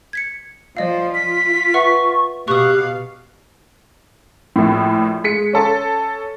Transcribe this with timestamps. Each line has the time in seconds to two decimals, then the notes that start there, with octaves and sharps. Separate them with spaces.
0.13 G#6 B6 C#7
0.77 F3 C5 D5 D#5 F5
1.14 F4 B6
1.74 B4 E5 F#5 C#6
2.48 B2 G4 F5 C#6 D#6 F#6
4.56 A#1 A2
5.24 G#3 B6 C#7
5.53 C#4 A4 A5